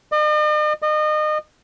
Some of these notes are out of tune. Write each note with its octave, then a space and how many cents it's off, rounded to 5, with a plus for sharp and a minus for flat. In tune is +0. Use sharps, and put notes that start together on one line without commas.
D#5 -45
D#5 -30